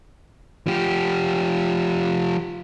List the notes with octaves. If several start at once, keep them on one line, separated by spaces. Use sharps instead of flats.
F3 G4